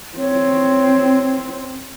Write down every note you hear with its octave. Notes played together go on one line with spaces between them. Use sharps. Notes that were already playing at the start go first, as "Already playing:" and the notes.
C4 C#5